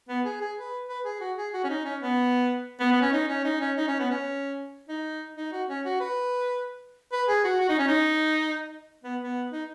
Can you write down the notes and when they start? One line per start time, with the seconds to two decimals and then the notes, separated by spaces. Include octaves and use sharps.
0.09 B3
0.25 G#4
0.41 G#4
0.58 B4
0.89 B4
1.05 G#4
1.21 F#4
1.37 G#4
1.53 F#4
1.64 C#4
1.69 D#4
1.85 C#4
2.01 B3
2.80 B3
2.92 B3
3.02 C#4
3.13 D#4
3.29 C#4
3.45 D#4
3.61 C#4
3.77 D#4
3.88 C#4
4.00 B3
4.11 C#4
4.89 D#4
5.37 D#4
5.53 F#4
5.69 C#4
5.85 F#4
6.01 B4
7.12 B4
7.29 G#4
7.44 F#4
7.60 F#4
7.69 D#4
7.79 C#4
7.88 D#4
9.04 B3
9.21 B3
9.52 D#4